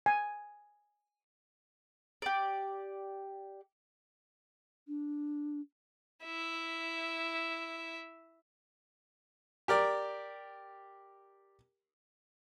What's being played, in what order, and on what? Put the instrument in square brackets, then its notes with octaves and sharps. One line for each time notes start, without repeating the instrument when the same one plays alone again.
[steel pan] G#5
[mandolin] G4 D5
[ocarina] D4
[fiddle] E4 E5
[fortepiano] G4 A#4 D5